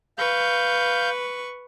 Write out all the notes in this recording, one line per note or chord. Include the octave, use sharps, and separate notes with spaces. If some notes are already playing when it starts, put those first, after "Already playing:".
B4 F5 C#6 G6